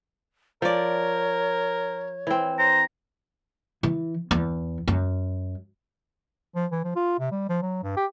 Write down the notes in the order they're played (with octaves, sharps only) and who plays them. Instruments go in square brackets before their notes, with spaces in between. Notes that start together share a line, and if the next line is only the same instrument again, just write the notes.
[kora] F3 D5 [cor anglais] A#4 [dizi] C#5
[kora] E3 C4
[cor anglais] C5 [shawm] A#5
[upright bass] E3
E2
F#2
[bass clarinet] F3
E3
F3
F4
C3
G3
F3
F#3
G2
G4